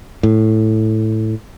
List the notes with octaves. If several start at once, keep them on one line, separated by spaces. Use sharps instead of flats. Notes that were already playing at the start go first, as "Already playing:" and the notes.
A2